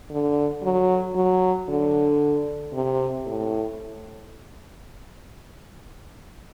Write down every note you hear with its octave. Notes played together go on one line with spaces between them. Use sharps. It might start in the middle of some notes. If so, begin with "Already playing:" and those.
D3
F#3
F#3
D3
C3
A2